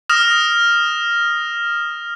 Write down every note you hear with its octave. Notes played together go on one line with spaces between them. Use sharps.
D#6 F6 A#6 E7